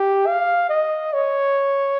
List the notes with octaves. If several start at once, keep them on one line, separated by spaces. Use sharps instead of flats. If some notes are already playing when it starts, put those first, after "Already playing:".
Already playing: G4
F5
D#5
C#5